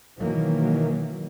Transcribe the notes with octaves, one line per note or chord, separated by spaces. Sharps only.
B2 D#3 E3 F#3 A#3